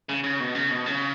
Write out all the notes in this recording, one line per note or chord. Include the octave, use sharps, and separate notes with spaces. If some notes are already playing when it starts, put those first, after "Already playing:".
C#3
C#3
B2
C#3
B2
C#3